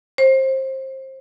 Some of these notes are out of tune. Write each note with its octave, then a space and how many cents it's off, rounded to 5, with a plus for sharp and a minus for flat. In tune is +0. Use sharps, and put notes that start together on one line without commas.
C5 +25